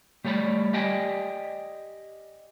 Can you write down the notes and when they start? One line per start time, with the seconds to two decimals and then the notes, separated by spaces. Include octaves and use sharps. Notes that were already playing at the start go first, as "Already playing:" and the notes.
0.24 G3 A3 C#5 D5 B5
0.73 G4 D5 D#5 G5 G#5